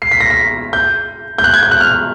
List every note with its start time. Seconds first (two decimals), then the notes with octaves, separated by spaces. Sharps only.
0.02 C7
0.11 B6
0.20 A#6
0.30 B6
0.73 G6
1.38 G6
1.44 F#6
1.54 G#6
1.63 G6
1.71 F#6
1.81 F6